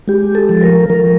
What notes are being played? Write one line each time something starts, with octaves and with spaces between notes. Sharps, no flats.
G#3 G4
A4
F3
A#4
F3 A#4